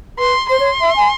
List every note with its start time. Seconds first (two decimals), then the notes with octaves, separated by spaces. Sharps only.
0.18 B4 C6
0.50 C5 C6
0.60 C#5
0.81 E5
0.96 G#5